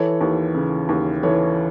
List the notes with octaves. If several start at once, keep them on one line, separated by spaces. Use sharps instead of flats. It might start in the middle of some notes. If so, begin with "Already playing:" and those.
Already playing: E3 A4 C#5
D#2
C#3
D#2
E3 A4 C#5